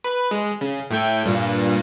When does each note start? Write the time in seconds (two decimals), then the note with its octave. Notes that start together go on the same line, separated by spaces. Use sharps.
0.04 B4
0.31 G#3
0.61 C#3
0.91 A2 A3 G5
1.26 G2 A#2